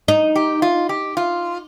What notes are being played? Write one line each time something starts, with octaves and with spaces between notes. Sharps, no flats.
D#4
G4
F4
G4
F4